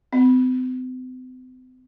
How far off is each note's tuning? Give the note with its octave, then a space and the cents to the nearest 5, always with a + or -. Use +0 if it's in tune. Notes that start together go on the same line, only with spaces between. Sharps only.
C4 -45